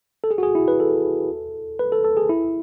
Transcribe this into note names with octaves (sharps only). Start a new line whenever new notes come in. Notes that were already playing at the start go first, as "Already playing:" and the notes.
A4
G#4
F#4
G#4
E4
B4
A4
B4
A4
A4
G#4
E4